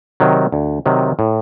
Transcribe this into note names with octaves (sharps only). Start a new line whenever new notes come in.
C3 D#3 F#3
D2
C3 D#3 F#3
A2